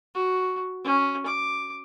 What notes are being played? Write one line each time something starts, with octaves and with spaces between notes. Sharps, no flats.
F#4
C#4
D6